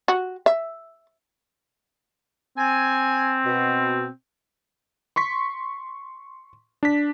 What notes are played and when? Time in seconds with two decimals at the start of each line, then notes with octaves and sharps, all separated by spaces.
0.08 F#4
0.46 E5
2.58 C4 G#5
3.46 B2
5.16 C6 C#6 B6
6.83 D4 B6